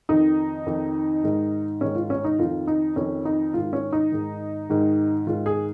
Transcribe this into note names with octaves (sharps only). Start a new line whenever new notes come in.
F2 D#3 D#4
F2 D#3
G#2 D#3
G#2 D#3 C#4
F4
C#4
D#4
F2 D#3 F4
D#4
F2 D#3 C#4
D#4
G#2 D#3 F4
C#4
D#4
G#2 D#3
G#2 D#3
G#2 D#3 F4
G#4